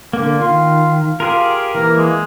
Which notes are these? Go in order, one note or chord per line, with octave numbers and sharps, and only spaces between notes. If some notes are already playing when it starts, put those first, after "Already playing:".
D3 A#3
D#3 F4
F4 G4 G#4 A#4
E3 A#3 A#4
G#3